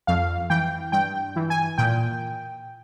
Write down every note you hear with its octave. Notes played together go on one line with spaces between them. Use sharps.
F2 F5
E3 G5
G2 G5
E3
G#5
A#2 G5